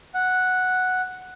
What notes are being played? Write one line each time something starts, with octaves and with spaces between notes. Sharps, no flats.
F#5